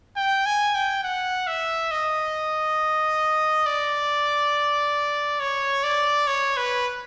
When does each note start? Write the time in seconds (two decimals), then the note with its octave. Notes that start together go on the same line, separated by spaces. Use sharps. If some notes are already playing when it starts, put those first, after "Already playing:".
0.17 G5
0.46 G#5
0.75 G5
1.04 F#5
1.47 E5
1.91 D#5
3.66 D5
5.40 C#5
5.84 D5
6.27 C#5
6.57 B4